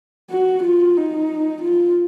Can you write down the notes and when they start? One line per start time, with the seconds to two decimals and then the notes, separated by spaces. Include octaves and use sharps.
0.31 F#4
0.63 F4
0.97 D#4
1.63 F4